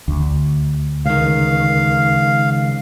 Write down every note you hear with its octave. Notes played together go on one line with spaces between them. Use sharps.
D2
C#2 D#3 F5